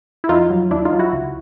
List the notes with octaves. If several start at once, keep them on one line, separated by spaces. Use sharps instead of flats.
E4
F2 D#4 F4
F#3
D#2 D4 E4
D#4 F4
F#3
E4 F#4
C#2